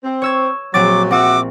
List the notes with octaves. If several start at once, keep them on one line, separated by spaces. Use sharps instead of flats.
C4
C#5 E6 G#6
A#1 F#3 C4 D6 A6
C4 F#4 E5 F#5 D6